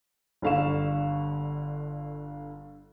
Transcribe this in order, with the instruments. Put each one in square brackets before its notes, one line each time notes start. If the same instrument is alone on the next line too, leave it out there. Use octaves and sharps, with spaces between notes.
[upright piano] G1 D3 F5 C#6 E7